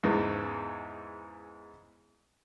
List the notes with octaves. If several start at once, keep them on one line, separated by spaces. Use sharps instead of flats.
E2 G#2 C#3 E3